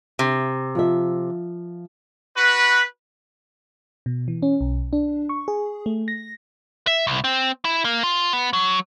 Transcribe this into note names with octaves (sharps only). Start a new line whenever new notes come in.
C3
F3 E5
F#4 B4
B2
E3
C#4
B1
D4
C#6
G#4
A3
A#6
E5
C2
C4
E4
A#3
F4
B3
F#3